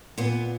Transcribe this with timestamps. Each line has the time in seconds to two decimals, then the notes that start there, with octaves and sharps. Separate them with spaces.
0.18 A#2 B3